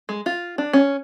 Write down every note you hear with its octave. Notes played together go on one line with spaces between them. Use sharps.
G#3
F4
D4
C#4